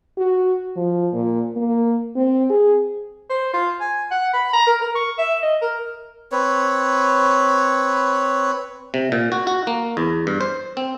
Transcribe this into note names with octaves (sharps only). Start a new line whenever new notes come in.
F#4
F3
A#2
A#3
C4
G#4
C5
F4
G#5
F#5
B5
A#5
A#4
A#4
C#6
E5
D#5
A#4
C4 B4 C#5
C3
A#2
F#4
F#4
A#3
E2
G2
C5
C4